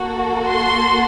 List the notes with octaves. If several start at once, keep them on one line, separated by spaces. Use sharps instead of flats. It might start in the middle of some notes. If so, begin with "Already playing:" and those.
Already playing: A#3 F#4 A4
C6